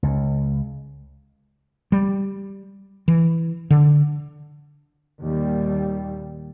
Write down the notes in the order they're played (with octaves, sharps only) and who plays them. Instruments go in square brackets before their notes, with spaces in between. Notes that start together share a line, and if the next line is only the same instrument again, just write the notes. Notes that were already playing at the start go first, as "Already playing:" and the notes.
[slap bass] C#2
[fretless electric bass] G3
E3
D3
[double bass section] D#2 A#2 G3